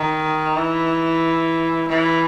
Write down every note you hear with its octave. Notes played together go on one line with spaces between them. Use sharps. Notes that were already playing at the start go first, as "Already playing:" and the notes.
Already playing: D#3
E3
E3